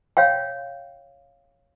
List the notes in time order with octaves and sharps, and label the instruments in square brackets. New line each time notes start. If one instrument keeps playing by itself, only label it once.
[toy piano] C#5 F5 G5